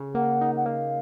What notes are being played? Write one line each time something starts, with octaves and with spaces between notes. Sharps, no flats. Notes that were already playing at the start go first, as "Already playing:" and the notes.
Already playing: C#3
A#3 F#5
D#4
F#5
A#3 F5